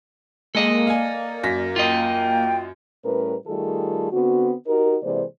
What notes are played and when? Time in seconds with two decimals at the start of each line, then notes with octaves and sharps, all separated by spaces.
0.55 G#3 A#3 A4 D#5
0.87 D5 F5 G#5
1.43 F#2 A#6 B6
1.76 F4 D#5 G5
3.05 A2 G3 C#4 A#4 B4
3.48 D#3 G3 A3 F4 G#4 A4
4.13 D3 B3 C4 F#4
4.67 D#4 F#4 G4 A#4
5.03 C3 E3 G#3 A#3 C5 D5